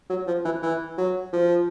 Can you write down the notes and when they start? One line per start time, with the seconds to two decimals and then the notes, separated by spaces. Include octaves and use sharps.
0.09 F#3
0.27 F3
0.45 E3
0.63 E3
0.98 F#3
1.33 F3